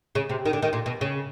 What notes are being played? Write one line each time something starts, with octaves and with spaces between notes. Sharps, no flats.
C#3
C3
D#3
D3
D#3
A#2
B2
C#3